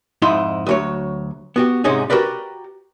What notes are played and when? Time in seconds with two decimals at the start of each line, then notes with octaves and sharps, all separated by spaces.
0.22 F2 G#2 D#4 E4 C6
0.66 D2 F#3 C#5
1.56 B3 F#4 G4
1.84 G#2 C3 G#3 C#4 D#4 G#4
2.10 F#4 G4 A#4 B4 D5